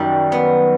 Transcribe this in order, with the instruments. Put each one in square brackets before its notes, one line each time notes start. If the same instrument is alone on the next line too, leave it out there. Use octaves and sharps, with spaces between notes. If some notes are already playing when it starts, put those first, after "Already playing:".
Already playing: [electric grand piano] F#2 D#3 F#3 [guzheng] G3
[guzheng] B3